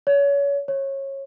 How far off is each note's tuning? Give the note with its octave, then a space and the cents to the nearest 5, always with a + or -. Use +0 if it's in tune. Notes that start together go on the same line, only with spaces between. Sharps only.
C#5 +30
C#5 -25